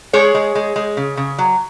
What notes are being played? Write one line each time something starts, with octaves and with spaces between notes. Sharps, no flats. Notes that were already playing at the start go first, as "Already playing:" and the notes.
G#3 G#4 C#5
G#3
G#3
G#3
C#3
C#3
F#3